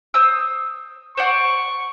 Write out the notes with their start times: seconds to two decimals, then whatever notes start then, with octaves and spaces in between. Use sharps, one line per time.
0.14 C5 D#6 E6
1.17 C5 D5 F#5 C#6